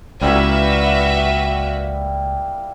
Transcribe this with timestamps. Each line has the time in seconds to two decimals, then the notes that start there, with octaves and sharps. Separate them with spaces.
0.21 C#2 G3 A#3 E4 F#4 B4 E5